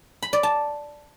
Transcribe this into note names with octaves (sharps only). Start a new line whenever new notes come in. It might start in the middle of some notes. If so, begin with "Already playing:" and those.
B5
D5
A5